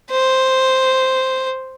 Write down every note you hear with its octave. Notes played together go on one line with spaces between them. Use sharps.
C5